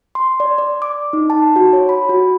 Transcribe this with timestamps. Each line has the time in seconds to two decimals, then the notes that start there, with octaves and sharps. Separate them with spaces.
0.15 C6
0.40 D5
0.58 D5
0.82 D6
1.13 D#4
1.30 A5
1.56 F#4
1.73 C#5
1.89 B5
2.09 F#4